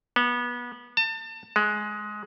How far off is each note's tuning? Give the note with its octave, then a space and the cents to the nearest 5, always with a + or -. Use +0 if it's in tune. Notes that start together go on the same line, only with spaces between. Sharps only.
B3 -25
A5 +30
G#3 +15